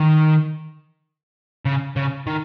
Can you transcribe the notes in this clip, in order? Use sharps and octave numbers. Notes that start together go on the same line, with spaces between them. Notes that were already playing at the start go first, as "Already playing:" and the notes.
Already playing: D#3
C#3
C#3
D#3